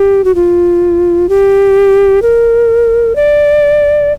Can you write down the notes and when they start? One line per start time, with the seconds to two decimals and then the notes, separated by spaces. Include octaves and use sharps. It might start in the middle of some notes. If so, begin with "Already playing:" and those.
Already playing: G4
0.24 F#4
0.35 F4
1.29 G4
2.22 A#4
3.16 D5